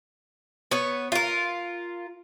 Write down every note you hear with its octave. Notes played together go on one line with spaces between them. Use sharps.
B3 C#5
F4 A#4